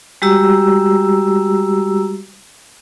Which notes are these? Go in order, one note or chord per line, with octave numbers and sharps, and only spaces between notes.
G3 G#3 F#4 G4 A#5 E6